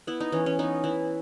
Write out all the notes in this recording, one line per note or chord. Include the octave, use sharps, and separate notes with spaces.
B3 E4
D#4
E3 C#4
C#4
B3 D#4
E3 E4